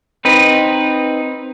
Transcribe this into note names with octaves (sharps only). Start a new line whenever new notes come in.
C4 D#4 B4